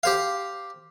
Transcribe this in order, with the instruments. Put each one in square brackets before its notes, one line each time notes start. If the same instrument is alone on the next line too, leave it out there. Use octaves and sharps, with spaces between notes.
[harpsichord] G4 C5 F5